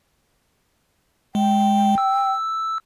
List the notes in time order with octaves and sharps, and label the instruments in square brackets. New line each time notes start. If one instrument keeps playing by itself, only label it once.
[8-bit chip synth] G#3 [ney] G5
[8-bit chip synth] E6